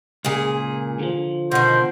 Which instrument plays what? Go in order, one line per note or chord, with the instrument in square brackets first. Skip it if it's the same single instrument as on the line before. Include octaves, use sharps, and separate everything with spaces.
[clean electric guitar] C#2 [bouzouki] A#2 G#4
[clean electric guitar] D3 F3
[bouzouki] B2 D#3 [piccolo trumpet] C5